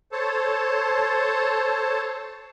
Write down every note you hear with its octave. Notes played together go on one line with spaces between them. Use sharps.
A4 C5 C#5 A5